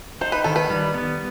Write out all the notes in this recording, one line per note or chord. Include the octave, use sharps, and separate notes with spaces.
D#4 C5
B4
D#3 A4
B4
G3
B3